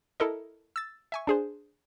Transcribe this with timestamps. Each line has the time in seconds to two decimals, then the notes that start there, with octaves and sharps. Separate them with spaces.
0.20 E4 A4 A#4 D#5
0.76 E6 A6
1.12 E5 G#5 C#6
1.27 D4 G#4 C5